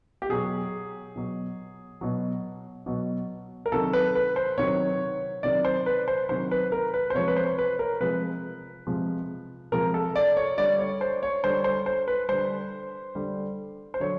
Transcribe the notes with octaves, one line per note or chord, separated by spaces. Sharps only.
G4
B2 F#3 G#4
B2 F#3
B2 F#3
B2 F#3
A#4
C3 D#3 F#3 A4
B4
B4
C5
C3 D#3 F#3 C#5
C3 D#3 F#3 D5
C5
B4
C5
C3 D#3 F#3 C5
B4
A#4
B4
C5
C3 F3 G#3 C#5
B4
C5
B4
A#4
C3 F3 G#3 B4
C3 F3 G#3
C3 F3 G#3 A#4
A4
D5
C#5
D3 G3 D5
C#5
C5
C#5
D3 G3 C5
C5
C5
B4
D3 G3 C5
D3 G3
C5
D3 F#3 C#5